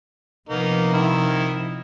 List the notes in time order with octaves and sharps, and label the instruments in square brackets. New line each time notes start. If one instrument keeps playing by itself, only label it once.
[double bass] C3 F3 [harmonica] A#3 B3 D#4
[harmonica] D#3 E4